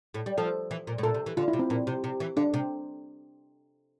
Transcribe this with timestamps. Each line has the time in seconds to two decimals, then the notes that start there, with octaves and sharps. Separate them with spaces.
0.14 A2
0.26 G3
0.38 F3 A4
0.71 E3
0.87 A#2
0.98 A2
1.03 A#2 A4
1.14 C3
1.26 E3
1.37 D3 F4
1.48 E4
1.53 C3
1.59 C4
1.70 A#2 C4
1.87 C3
2.04 C3
2.20 E3
2.37 D3 D4
2.54 C3